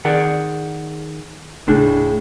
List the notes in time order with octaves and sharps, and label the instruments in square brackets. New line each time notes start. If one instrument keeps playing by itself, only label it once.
[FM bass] D#3 [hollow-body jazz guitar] G#4 D5 F#5
[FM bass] D#1 [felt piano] A2 C#3 [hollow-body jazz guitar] D4